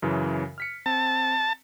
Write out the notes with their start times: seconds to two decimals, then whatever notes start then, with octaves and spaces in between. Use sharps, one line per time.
0.02 F#2 C#3 E3
0.58 F6 B6 C#7
0.86 C4 A5